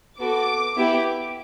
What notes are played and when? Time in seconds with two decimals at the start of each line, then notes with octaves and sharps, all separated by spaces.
0.20 B3 F#4 A4 D6
0.76 B3 E4 G4